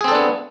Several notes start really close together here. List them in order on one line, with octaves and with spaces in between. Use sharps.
G#4 C4 A4 D4 B3